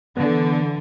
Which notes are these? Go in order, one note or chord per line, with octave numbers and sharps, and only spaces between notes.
D3 E3 B3